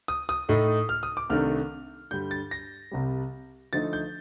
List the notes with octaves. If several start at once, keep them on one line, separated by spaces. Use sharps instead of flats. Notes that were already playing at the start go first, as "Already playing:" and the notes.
D#6
D#6
A2 A3 D#4
F6
D#6
D6
C2 C3 D#3 A3 D4 F6
G2 D3 G3 G6
A6
A#6
C2 C3 G3
D3 F3 A3 D#4 A6
G6